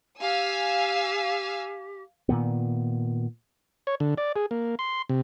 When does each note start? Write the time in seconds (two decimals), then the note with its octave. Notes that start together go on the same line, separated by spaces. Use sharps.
0.21 G4 F5 G#5 E6
2.29 A#2 D#3 B3
3.87 C#5
4.00 D3
4.18 D5
4.36 G#4
4.51 A#3
4.79 C6
5.09 C3